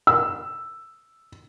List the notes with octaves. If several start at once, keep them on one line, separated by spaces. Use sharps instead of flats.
E6